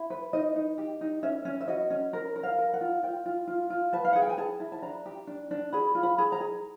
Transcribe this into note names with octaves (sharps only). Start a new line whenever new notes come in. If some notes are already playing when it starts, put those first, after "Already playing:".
Already playing: E4
B4
D#4 D#5
D#4
G4
D#4
C#4 E5
C#4
E5
F#4 D#5
C#4
A#4
A#4
F5
A#4
F#5
F4
F4 G5
F4
F4
F4
B4 A5
F5
G#4 F#5
G5
G#5
G#4 A5
E4
A5
D4 A#5
G4
D4
D4
G#4 B5
F4
B5
G#4
A#5
G#4